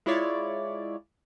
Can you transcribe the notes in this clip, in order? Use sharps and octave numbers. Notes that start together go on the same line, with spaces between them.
G#3 E4 F4 C#5 D5